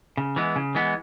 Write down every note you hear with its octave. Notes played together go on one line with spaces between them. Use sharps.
C#3
E3 G#3 B3
C#3
E3 G#3 B3